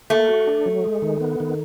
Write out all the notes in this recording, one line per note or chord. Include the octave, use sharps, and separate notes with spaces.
A3 A#3
F#4
D4
F#3
G#3
D#3
B3
D#3